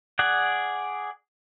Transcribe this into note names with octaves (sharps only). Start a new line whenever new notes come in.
G#4 D5 F#5